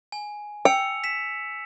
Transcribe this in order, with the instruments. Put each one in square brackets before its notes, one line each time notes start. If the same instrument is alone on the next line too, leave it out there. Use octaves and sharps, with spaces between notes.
[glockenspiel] G#5
[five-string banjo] G5 [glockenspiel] E6 C#7 F7
[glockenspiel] B6 E7